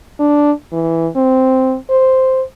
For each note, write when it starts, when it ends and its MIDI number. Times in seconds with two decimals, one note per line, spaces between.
0.20 0.52 62
0.72 1.08 52
1.16 1.76 60
1.90 2.42 72